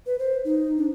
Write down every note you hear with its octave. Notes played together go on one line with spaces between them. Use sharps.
B4
C5
D#4
D4